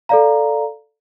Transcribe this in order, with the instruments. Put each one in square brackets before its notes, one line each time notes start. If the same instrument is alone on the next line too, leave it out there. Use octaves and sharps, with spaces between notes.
[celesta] A4 D5 F5 A#5